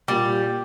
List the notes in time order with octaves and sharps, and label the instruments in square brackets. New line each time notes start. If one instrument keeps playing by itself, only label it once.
[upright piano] A#2 [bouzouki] G3